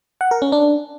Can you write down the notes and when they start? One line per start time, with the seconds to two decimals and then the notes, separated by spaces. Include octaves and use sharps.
0.21 F#5
0.31 A#4
0.42 C#4
0.52 D4